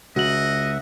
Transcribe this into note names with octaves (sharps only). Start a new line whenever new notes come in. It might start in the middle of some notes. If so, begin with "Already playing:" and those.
C#2 F#4 D#5 E5 F#5 F#7